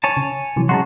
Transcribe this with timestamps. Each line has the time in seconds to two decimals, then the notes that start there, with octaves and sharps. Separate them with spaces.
0.04 C#5 G#5 A5
0.17 C#3
0.56 C3 E3 F#3
0.69 C#3 G#3 F#4 A5 A#5 C6